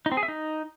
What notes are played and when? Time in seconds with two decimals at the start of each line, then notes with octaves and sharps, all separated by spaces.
0.06 D#4
0.12 C4
0.17 G#4
0.23 E5
0.28 D#4